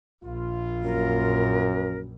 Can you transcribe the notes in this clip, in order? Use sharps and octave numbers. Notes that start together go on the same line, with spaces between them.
A#1 F4
F#2 A#4